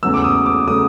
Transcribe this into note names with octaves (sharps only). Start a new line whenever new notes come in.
E2 C#3 F#3 A3 E6
D6
D#6
D6
C#3 F#3 A3 D#6